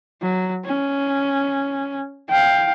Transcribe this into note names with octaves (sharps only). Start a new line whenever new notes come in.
F#3
C#4
F5 G5